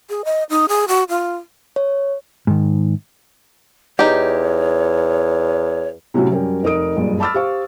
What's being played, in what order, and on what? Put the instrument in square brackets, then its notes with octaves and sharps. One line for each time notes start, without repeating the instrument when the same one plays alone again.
[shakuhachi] G#4
D#5
D#4
G#4
F#4
F4
[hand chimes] C#5
[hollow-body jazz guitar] G#2 D#3
[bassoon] E2 [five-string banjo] D#4 G4 [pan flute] C#5
[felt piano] A2 C3 F#3 C#4 E4 F#4
F#2 G3 C#4 A#4 G5
F1 D#4 A#4 D#5 D#6 D7
F#1 G2 A#2
A5 B5 D6 E6 F6 A6
G4 C5 F5 C#6